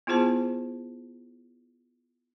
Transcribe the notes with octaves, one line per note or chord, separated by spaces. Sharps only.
B3 E4 F4 G#4 C5 A5